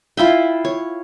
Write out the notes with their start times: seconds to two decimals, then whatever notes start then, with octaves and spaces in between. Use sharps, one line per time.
0.17 E4 F4 E5 G5
0.65 C#5